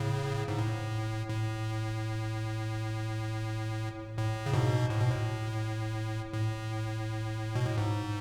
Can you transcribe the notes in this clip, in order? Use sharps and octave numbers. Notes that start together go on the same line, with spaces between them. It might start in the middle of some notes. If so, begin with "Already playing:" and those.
Already playing: A2 C#3
G#2
A2
A2
A2
C#3
G#2 B2
A2
B2
A2
A2
B2
A2
G#2